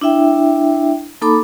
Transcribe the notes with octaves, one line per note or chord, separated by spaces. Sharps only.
D4 E4 E5 G5
A#3 D#4 A4 A5 B5 D6